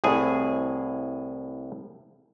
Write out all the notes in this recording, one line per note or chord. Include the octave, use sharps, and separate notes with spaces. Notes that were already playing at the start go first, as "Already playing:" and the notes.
C2 A2 G#4 G#5